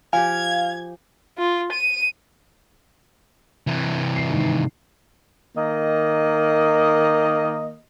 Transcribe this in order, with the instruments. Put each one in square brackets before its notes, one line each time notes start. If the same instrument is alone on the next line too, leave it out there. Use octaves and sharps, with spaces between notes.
[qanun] F3 G4 [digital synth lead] F5 [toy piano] G#5 [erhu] G#6
[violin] F4
D#7
[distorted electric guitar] C3 E3
[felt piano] C7
G#2 D#3
[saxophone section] D#3 A#3 D#5